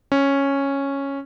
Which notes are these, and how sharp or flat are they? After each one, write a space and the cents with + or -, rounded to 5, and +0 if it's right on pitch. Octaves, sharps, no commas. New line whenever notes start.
C#4 -5